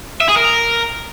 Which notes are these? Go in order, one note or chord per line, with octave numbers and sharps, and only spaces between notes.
E5
G#4
A#4